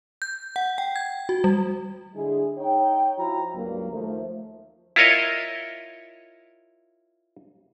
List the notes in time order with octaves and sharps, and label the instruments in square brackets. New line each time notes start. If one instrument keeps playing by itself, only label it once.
[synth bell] G6
F#5
G5
G#6
F#4
G3
[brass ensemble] D3 G#3 D4 E4 G#4
D#4 C#5 G5
F3 E4 F#4 A#5
C#2 G2 F#3 A#3
D#2 F3 A3
[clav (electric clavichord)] E4 F4 A#4 C#5 D#5